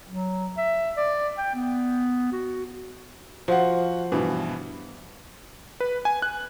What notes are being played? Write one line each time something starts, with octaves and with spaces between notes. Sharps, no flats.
F#3
E5
D5
G5
B3
F#4
F3 F#4 F5 F#5
G2 B2 E3
B4
G#5
F#6